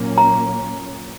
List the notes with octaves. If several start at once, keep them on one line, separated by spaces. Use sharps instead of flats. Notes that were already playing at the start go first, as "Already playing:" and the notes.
Already playing: A#2 F#3 A#3 C#4
A#5